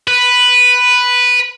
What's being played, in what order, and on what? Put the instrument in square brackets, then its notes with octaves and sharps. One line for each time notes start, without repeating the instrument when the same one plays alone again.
[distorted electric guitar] B4